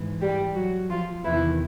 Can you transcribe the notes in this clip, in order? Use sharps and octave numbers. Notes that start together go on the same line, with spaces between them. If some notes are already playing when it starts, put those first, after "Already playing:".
Already playing: G#2 E3
G3 G4
F#3 F#4
F3 F4
E2 C3 D#3 E3 E4